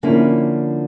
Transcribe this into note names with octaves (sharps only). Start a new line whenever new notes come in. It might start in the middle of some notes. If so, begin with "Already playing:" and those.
D3 F3 A#3 C#4 E4